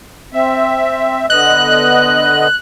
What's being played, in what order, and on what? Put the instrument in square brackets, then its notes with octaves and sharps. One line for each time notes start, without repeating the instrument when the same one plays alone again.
[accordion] C4 E5
[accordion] D3 B3 D#5 [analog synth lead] F#6